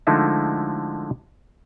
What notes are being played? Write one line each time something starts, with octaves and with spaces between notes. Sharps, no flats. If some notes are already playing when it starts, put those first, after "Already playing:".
D3 F3 G#3 A3 D#4 E4